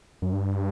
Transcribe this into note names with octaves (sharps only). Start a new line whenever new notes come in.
F#2
G2